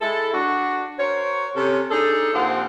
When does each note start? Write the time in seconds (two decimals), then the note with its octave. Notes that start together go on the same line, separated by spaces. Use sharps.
0.01 G#3 E4 A4
0.33 D4 F#4
0.99 F#4 A#4 C5 C#5
1.56 C3 C#4 A4
1.90 D4 D#4 G#4 A4
2.33 D#2 A#2 F3 C4 C5 F#5